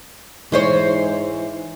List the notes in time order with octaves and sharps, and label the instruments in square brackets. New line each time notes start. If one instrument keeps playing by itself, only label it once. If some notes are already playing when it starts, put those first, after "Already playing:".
[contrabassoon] G#2 [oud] E3 C5 C#5